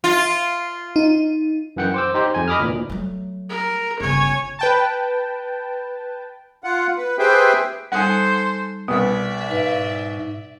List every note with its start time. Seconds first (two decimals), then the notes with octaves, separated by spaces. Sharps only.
0.04 F4
0.96 D#4
1.76 F#2 E3 F#5 G5 C#7
1.94 C5 D6 E6
2.14 D#4 G4 C5
2.35 F2 G#5
2.48 D#5 B5 D6 D#6 F6
2.60 D2 A#2 E3
2.90 F#3 A3
3.49 A#4
4.01 G1 C#3 C#5 G#5
4.59 B4 G5 A5
6.64 F4 F#5
6.97 B4
7.19 G4 G#4 B4 C5 E5 G5
7.92 G3 D#4 A4 C5 F#5 G#5
8.88 C2 B2 B3 D5 E5
9.51 G#2 B4 F5